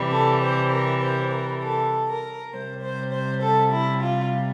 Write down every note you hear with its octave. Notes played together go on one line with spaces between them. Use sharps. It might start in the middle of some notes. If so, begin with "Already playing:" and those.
Already playing: C3 E3 G3
A4
C5
A#4
C5
A#4
A4
A#4
C3 G3 C5
C5
C5
A4
E4
F4